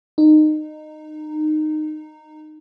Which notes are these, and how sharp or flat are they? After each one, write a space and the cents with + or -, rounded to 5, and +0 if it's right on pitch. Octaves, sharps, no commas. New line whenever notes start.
D#4 -20